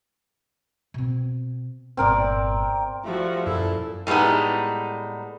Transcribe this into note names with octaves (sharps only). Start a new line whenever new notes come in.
B2 C4
G1 A#2 C4 A#4 D5
F3 G3 A3 F#4
F#2 A#2 E4 A4
A2 G3 G#3 B3 D#4